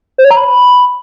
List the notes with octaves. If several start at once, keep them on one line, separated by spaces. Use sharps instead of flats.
C5
C#5
A#5
B5